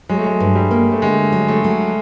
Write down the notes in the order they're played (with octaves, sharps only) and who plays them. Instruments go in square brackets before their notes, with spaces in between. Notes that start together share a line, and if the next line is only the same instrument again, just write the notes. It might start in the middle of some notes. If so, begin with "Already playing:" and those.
[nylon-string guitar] F#3 [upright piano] G#3
[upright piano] A3
G#3
[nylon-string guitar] G2
[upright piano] G3
[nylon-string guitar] A#3
[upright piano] A3
[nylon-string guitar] D3 [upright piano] G#3
[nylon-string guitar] F#3
[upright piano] A3
[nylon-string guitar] F#3